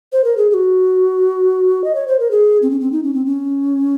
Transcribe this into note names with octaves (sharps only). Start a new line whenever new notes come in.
C5
A#4
G#4
G#4
F#4
D#5
C#5
C5
A#4
G#4
C4
C#4
C4
D#4
C#4
C4
C#4